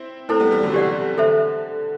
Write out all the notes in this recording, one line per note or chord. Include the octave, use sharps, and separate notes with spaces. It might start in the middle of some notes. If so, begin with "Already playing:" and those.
Already playing: C4 E4
A3 C4 E4 A4 C5
G3 B3
E3 G3
D3 F#3
C3 E3 G4 D5 F#5
D3 A4 C5 E5